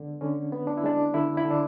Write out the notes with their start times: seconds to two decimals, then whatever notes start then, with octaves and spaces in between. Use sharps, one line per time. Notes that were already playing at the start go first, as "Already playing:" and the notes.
Already playing: D3 G#3 B3 D4
0.21 D3 C#4
0.53 B3
0.67 D4
0.77 E4
0.84 G#3 D4
1.14 D3 E4
1.37 E4
1.45 D3
1.50 D4